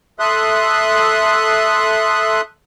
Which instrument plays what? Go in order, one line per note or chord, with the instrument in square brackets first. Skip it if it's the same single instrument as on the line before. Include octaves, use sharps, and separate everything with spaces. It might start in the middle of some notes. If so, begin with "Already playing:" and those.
[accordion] A4 E5 C6 D#6 F#6